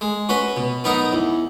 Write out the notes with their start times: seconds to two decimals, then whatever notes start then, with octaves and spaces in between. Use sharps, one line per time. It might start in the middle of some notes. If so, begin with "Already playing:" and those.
0.01 G#3
0.29 C#4 F#4 B4
0.57 B2
0.84 F#3 B3 D#4 A#4
1.13 E2